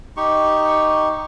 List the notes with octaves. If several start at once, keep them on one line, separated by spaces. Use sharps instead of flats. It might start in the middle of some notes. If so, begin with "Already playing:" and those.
D#4 G4 C#6